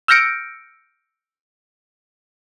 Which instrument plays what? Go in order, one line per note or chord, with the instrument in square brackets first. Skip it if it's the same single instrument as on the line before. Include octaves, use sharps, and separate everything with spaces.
[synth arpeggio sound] E6 F6 G6 A#6 C#7 D7